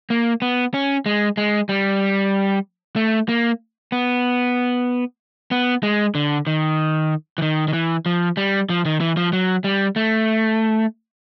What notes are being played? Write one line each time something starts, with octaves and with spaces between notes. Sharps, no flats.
A#3
B3
C#4
G#3
G#3
G3
A3
A#3
B3
B3
G#3
D3
D#3
E3
D#3
D#3
E3
F3
G3
F3
D#3
E3
F3
F#3
G3
A3